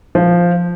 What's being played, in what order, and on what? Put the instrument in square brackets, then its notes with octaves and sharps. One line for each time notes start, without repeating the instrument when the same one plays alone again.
[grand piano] F3